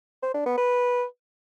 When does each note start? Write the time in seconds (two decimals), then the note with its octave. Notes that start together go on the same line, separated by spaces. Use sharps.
0.23 C5
0.34 D4
0.46 B3
0.58 B4